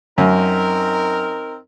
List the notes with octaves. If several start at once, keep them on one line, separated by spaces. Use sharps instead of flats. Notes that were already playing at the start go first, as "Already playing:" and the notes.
F#2 C4 D#4 A#4